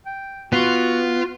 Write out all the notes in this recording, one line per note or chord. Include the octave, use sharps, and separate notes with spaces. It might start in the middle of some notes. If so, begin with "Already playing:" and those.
G5
B3 F4 F#4